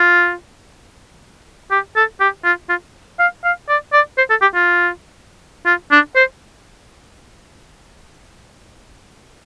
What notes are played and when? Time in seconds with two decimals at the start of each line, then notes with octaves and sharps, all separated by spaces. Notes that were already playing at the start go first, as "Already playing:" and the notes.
Already playing: F4
1.71 G4
1.96 A4
2.20 G4
2.44 F4
2.70 F4
3.19 F5
3.44 F5
3.69 D5
3.93 D5
4.18 C5
4.30 A4
4.42 G4
4.55 F4
5.66 F4
5.91 D4
6.16 C5